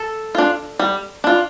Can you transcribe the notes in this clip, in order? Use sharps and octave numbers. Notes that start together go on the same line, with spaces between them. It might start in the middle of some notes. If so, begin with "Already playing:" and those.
Already playing: A4
D4 F4
G3
D4 F4